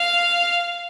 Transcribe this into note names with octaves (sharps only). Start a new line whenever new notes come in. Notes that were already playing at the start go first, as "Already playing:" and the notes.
Already playing: F5